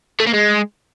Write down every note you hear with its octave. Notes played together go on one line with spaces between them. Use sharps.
A3
A#3
G#3